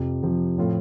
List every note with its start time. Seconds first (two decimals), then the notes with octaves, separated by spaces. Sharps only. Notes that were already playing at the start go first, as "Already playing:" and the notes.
Already playing: F2 C3 F3
0.22 F2 C3 F3
0.58 A2 F3 C4 F4 A4